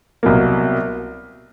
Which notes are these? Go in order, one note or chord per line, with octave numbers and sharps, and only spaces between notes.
C2 B2 F#3 A#3